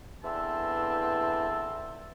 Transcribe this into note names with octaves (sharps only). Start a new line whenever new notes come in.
E2 D3 E3 C4 A5 E6